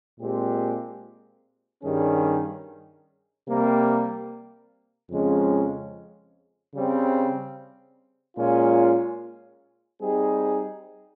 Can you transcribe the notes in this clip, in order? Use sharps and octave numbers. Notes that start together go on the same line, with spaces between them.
A#2 G#3 C4 G4
G2 D#3 G3 C#4 G#4
C3 G3 A#3
F2 C#3 F3 G#3 C#4
C#3 G3 C4
A#2 G#3 C#4 F4
G3 C4 D#4 G#4